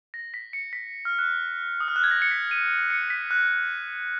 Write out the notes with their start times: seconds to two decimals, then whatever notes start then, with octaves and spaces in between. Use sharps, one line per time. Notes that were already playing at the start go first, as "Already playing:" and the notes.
0.14 A#6
0.34 B6
0.53 C#7
0.73 B6
1.05 F6
1.19 F#6
1.80 D#6
1.88 F6
1.96 F#6
2.04 G#6
2.11 A#6
2.22 C#7
2.31 B6
2.51 D#7
2.90 C#7
3.10 B6
3.31 F#6